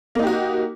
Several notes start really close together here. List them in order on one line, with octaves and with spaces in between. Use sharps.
A#3 D#4 G4 F#4